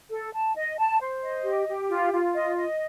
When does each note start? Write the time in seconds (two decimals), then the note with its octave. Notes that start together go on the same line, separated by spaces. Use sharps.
0.10 A4
0.33 A5
0.56 D#5
0.78 A5
1.00 C5
1.22 D#5
1.44 G4
1.68 G4
1.90 F4
2.12 F4
2.34 D#5
2.57 D#5